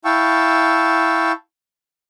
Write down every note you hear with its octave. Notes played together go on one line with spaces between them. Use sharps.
E4 F5 G5 A5 C#6 E6